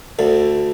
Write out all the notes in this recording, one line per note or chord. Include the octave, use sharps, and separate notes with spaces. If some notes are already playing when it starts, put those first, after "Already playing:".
D2 D3